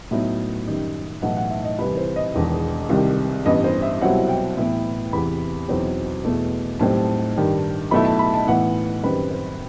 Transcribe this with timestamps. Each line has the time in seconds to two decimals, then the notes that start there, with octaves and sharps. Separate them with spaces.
0.11 A2 F#3 B3 D#4 E5
0.67 F#2 D#3 G3 D#4
1.22 B1 A2 E3 F#5
1.37 F#5
1.51 E5
1.64 D#5
1.78 C2 C3 E3 B4
1.97 C5
2.16 D#5
2.34 E1 E2 D#3
2.89 C2 C3 D#3
3.45 A1 G2 E3 G3 B3 D#5
3.64 C5
3.82 E5
4.01 C2 B2 F#3 C4 E4 F#5
4.29 G5
4.57 A2 E3 B3 E4
5.13 E2 C3 E3 B5
5.68 E2 B2 F#3 C4 D#4
6.25 E2 B2 A3
6.80 B1 A2 G3 C4 A5
7.36 G2 D#3 G3
7.91 B1 B2 A3 E4 B5
8.05 A5
8.19 B5
8.34 A5
8.47 A2 E3 B3 F#5
9.03 F#2 D#3 G3 C4 B4
9.31 C5